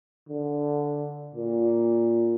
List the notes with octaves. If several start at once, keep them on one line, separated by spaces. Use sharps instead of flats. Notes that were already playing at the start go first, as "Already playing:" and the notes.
D3
A#2